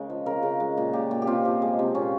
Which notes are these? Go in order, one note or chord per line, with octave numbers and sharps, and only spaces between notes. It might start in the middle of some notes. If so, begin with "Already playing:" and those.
Already playing: C#3 G#3 A#4 D#5
F3
C#3 A#4
C#3
G#3
A#2
A#2 G4
A#2
G4
C3 F4
F3
G#3
C3
A#2 C#4